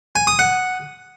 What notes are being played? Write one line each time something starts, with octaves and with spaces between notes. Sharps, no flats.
G#5
D#6
F#5